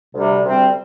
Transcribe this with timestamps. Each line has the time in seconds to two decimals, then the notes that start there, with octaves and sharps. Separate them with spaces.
0.14 D2 C3 G3
0.44 D2 C3 G3 C4